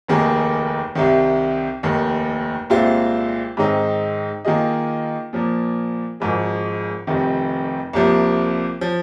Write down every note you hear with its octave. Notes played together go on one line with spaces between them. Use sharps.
F1 D#2 D#3 A#3 G#4
C2 C3 D#3
F1 D#2 D#3
C2 A#2 G#3 C4 F4
G#2 D#3 G#3 C4 D#4
D#3 A#3 F4 G#4 D#5
A#2 F3 A#3
G#1 G#2 F3 G#3
F1 F2 C3 D#3
C2 C3 F3 A#3
F3